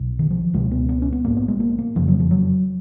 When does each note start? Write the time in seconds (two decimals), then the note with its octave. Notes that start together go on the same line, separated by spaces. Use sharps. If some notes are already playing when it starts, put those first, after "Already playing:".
Already playing: B1 B2
0.19 D#3
0.31 F3
0.54 C#2 B2 G#3
0.71 B3
0.89 B3
1.02 C#4
1.12 B3
1.25 A#1 G#2 A#3
1.37 B3
1.48 G#3
1.60 A#3
1.78 A#3
1.95 F#1 F2 C#3 F3
2.08 F#3
2.20 F3
2.31 F#3